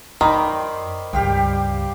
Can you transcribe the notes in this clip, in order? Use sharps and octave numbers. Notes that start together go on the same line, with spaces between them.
F#2 D#3 C5 D5 B5
C#2 G2 G4 F5 G5